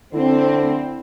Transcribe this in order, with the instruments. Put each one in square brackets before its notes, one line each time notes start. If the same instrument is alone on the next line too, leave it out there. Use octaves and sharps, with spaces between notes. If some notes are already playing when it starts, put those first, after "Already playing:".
[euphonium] D3 [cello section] C4 [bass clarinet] E4